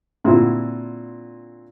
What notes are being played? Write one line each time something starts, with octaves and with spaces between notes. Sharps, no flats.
A#2 D3 C4 E4 F#4